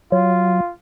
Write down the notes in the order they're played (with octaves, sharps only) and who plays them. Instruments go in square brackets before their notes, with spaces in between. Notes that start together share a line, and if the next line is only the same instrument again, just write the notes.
[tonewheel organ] F#3 [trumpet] F4